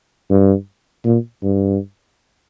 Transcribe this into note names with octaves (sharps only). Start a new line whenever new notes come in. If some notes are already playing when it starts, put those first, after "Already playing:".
G2
A#2
G2